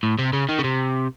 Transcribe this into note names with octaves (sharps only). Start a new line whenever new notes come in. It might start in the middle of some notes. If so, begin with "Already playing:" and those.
A2
C3
C#3
D#3
C#3
C3